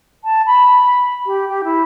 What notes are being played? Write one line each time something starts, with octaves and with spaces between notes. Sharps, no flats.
A5
B5
G4
G4
E4